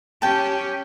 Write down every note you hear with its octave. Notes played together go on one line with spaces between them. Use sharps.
C#4 G4 G5 A5